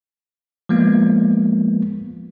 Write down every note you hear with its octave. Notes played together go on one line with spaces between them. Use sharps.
F3 G#3 A#3 B3 F4